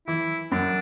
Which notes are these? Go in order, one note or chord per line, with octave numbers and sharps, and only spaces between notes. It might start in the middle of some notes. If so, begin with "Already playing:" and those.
E3 E4
F#2 D4